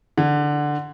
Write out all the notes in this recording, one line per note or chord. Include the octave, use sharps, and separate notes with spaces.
D3